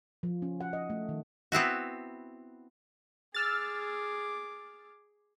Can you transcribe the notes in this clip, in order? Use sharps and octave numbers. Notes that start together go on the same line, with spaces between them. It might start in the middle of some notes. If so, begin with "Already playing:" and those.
F3
C#4
F#5
D#5
A3
D#3
B3 C4 E4 F#4
G#4 D6 E6 F6 A6